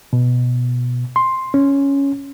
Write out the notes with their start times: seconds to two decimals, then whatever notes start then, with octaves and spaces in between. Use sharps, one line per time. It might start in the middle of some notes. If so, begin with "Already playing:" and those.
0.13 B2
1.16 C6
1.54 C#4